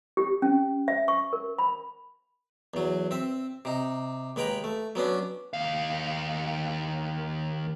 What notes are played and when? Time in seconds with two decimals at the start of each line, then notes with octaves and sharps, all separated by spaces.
0.17 G4
0.42 C#4
0.88 E5
1.08 C#6
1.33 A#4
1.59 B5
2.74 E2 F#3
3.11 C4 E5
3.65 C3 D#4
4.36 D#2 G#3 B4 G5 A#5
4.64 A3
4.95 F#3 B3 C#4 D4
5.53 D#2 F5